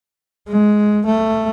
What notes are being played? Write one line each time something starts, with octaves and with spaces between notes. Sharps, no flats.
G#3
A3